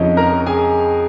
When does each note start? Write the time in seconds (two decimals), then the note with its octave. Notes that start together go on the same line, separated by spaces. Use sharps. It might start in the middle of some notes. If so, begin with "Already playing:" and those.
Already playing: F2 C#3 F3 D#4 C#5 D#5
0.17 A#4 A#5
0.46 G#4 G#5